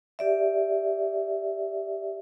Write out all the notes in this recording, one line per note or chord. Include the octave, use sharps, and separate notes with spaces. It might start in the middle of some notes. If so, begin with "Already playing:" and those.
G4 D5 E5